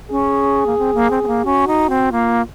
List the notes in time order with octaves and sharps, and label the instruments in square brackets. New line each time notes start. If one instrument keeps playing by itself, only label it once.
[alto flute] C#4 [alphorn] G#4
[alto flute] A#3
C4
A#3
C4
C4
A#3
[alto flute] C#4 [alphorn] F#4
[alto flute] D#4
C4
[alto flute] A#3 [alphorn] F4